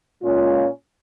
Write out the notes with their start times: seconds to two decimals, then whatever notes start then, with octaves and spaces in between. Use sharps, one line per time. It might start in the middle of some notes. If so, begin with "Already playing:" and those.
0.22 A#2 G#3 C#4 F4